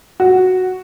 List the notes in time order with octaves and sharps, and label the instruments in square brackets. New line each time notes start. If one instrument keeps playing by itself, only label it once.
[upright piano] F#4